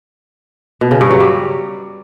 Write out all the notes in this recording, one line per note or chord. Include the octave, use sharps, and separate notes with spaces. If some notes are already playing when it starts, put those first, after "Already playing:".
B2
C#3
G2
F#3
G3